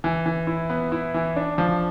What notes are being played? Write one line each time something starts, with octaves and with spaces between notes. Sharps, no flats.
E3
E3
E4
B3
E4
E3
D4
F3